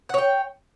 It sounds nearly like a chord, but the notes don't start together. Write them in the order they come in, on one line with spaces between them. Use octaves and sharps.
F#5 C#5 G5